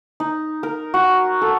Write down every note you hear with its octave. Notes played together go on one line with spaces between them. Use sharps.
D#4
A#4
F#4
A4